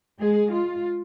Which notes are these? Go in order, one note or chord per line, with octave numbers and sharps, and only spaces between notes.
G#3 G#4
F4